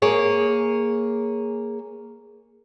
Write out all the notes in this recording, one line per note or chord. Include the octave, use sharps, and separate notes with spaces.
A#3 G#4 C#5